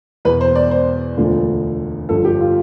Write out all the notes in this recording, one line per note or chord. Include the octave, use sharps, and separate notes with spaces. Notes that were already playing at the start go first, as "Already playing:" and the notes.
E2 B2 B4
C5
D5
C5
E1 D2 D3 F3
G1 F2 D3 F3 A4
G4
F4